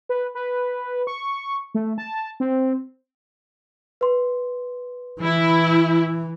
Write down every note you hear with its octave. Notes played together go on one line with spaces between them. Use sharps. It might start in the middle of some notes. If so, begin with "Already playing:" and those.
B4
B4
C#6
A3
A5
C4
B4 C6
E3 E4